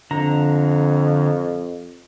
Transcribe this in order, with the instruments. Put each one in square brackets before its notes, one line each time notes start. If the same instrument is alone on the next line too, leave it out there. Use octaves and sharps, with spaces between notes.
[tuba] F2 [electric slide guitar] D3 A#5